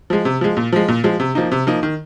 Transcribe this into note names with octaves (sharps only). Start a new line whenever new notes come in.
F3 G#3
C3
F3 G#3
A#2
F3 G#3
A#2
F3 G#3
C3
F3 A#3 D#4
C3
F3 A#3 D#4
D#3